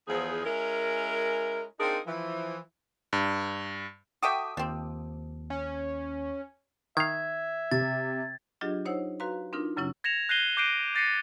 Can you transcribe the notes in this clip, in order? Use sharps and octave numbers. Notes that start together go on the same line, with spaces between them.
E2 F3 G#4
G#3 C#4 E4 A#4
C4 D4 D#4 F4 G#4 A#4
E3 F3
G2
F#4 A4 E5 G5 D6 D#6
D#2 F3 C4
C#4
D#3 E5 F5 G#6
C3 A6
F#3 D4 F4 G4 G#4 D#5
D#4 C5 C#5 F#5 E6
F#4 B4 F5 A#5 C6
C4 D4 D#4 F4 A#4
F#2 C#3 F#3 C#4 E4
G#6 A#6 C#7 E7 F7
F#6 G6 A#6 C7 D#7 G7
D6 F#6 G6 C7 D7 D#7
G6 A6 A#6 C7 C#7 D#7